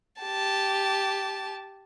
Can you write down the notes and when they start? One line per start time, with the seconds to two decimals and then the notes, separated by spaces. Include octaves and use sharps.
0.21 G4 A5